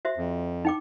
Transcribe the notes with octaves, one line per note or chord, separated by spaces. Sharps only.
F#4 C5 E5
F2
D#4 G5 D6